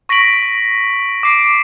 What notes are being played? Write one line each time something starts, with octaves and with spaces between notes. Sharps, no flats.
C#6 A#6 B6 D7 F#7
D6 C7 D7